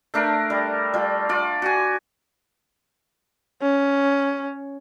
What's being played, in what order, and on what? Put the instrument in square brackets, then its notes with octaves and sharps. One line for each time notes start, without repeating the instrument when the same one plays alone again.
[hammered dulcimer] A3 D4 A#4
G3
G3 F4
F4 D5
F#4 G#5
[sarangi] C#4